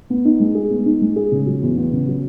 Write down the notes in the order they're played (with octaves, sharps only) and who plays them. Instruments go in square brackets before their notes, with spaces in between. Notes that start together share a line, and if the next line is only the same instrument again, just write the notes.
[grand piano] B3
D#4
G#3
G#4
B3
D#4
G#3
G#4
C#3
F#3
E2
B3
C#3
F#3